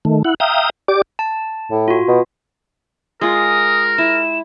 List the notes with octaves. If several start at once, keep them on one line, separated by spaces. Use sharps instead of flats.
D#3 A3
E4 F#5
E5 F5 G5 A#5 D#6
G4 D5 D6
A5
A2
F4 F#4
B2
G#3 F4 A#4 D#6
E4 E7